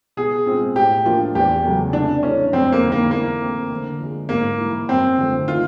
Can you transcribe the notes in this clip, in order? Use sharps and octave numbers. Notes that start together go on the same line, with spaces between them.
B2 G#4
G#3 C4 F4
A2 G4
F3 A#3 D4 F4
E2 G4
C#3 F#3 A3
C3 D4
E3 A3 C#4 D4
F2 C4
A#3
D3 G3 C4 D#4
A#3
E3 A#3
A3 C4
D3
F3 G#3
G#2 A#3
E3 G3
F#2 C4
D3 F3 A3
D#3 F4